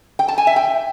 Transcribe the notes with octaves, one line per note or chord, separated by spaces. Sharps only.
G5
A5
G#5
E5
G5